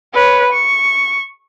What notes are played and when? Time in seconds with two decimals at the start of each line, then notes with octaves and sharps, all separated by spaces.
0.14 B4 C#5
0.52 C#6